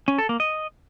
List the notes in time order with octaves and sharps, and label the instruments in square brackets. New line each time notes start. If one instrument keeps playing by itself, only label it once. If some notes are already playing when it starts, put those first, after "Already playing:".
[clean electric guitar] C#4
A4
A#3
D#5